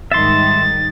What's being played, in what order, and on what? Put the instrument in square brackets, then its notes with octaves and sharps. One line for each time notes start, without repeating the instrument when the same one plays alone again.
[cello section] G#2 D#3 G3 [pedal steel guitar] E5 C6 [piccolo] A6